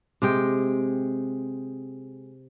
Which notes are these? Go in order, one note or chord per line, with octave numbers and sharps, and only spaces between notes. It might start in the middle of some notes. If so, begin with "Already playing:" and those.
C3 G#3 G5